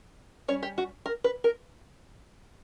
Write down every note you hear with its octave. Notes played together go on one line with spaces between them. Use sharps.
G3 C#4 C#5
G4
F#4
A#4
B4
A#4